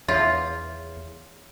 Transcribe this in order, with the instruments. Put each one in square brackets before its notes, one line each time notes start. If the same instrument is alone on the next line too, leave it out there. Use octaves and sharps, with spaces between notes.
[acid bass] E2 [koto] F4 [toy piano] G#4 C#5 E5